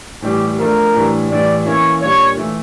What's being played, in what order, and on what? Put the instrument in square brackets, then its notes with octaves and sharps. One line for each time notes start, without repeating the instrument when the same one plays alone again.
[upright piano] A2 E3 G3 [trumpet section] G4
[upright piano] F3 A3 D4 [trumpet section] A#4
[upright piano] A2 E3 G3 D4
[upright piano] A2 E3 G3 [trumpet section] D5
[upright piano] E3 A#3 C#4 E4 [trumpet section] C#5
[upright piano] A#2 G3 A#3 D4 [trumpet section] C#5
[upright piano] E3 A3 E4